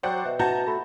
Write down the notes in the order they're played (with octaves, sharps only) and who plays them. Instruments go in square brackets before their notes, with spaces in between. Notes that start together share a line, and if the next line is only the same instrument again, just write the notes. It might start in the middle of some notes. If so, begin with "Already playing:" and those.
[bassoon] F#3 [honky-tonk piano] C5 D5 F#5 [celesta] G5
[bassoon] B2 [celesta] E5
[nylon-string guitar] F#4 [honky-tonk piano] A5 A#5 G6
[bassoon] A3 [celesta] B5